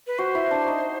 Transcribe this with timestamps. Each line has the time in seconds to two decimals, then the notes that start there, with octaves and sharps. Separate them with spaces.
0.07 B4
0.19 F#4 C5
0.35 E4
0.51 D4
0.68 D#4